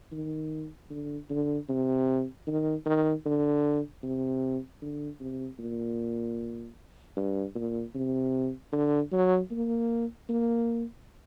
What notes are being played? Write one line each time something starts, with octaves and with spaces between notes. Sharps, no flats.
D#3
D3
D3
C3
D#3
D#3
D3
C3
D3
C3
A#2
G2
A#2
C3
D3
F#3
A#3
A#3